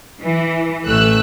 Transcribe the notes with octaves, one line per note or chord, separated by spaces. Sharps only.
E3
A1 A3 E6 F#6